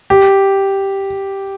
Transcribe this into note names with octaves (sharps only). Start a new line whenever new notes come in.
G4